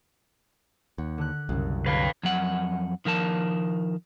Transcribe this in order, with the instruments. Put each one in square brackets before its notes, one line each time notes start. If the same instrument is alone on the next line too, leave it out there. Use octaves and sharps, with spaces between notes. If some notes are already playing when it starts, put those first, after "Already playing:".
[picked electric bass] D#2 [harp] F#5
[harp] D3 F#6
[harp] F#1 [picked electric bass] C2 F#2
[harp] D3 C#5 [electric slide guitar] B4 F5
[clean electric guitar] F2 F#3 F#5
D#3 F3 A#4 A5